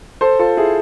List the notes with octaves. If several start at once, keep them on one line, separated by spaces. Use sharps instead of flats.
A4 C5
F4 A4
E4 G#4